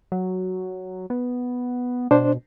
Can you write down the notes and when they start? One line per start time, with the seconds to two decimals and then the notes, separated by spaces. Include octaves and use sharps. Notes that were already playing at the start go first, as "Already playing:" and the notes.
0.12 F#3
1.10 B3
2.11 B2 D4 C5